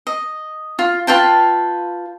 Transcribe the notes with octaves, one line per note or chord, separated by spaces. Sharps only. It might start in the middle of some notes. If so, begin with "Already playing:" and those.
D#5
F4
F4 B4 G5 A5